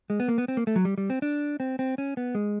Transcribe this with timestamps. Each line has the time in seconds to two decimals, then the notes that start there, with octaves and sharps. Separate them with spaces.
0.10 G#3
0.20 B3
0.28 A#3
0.38 B3
0.48 C4
0.57 A#3
0.67 A3
0.76 F#3
0.85 G3
0.98 G3
1.10 C4
1.22 D4
1.60 C4
1.79 C4
1.98 C#4
2.17 B3
2.35 G#3